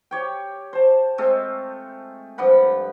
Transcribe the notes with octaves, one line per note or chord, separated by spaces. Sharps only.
G4 C#5 G5
C5 A5
G#3 A3 C4 F4
G2 F3 F#5 B5